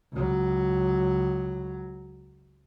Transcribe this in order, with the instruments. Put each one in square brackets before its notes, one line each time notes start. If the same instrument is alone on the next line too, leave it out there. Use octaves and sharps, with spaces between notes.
[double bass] C#2 F#3